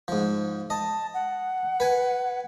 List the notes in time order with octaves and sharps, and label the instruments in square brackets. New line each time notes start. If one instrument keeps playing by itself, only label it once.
[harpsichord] G#2 F3
[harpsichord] D#5 [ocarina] A5
[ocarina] F#5
[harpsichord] B4 G#5